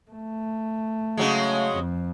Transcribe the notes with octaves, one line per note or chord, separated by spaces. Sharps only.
A3
C#3 F#3 G#3
F2